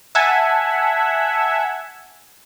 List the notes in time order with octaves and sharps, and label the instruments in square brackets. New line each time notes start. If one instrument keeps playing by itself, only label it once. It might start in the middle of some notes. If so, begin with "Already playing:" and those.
[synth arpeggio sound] E5 F#5 G#5 A5 G#6